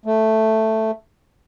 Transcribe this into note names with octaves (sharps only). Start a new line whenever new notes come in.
A3